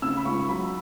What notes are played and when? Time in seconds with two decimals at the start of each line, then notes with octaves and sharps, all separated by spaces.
0.02 C#3 E6
0.17 B5
0.25 C#2 C#6
0.48 F#3 B5